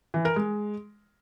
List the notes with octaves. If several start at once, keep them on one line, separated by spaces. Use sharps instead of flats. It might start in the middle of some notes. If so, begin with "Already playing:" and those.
E3
A#4
G#3